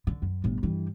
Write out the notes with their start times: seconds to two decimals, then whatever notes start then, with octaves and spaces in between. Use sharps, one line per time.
0.07 D3
0.22 F#2
0.44 G1 A2
0.63 G2 E3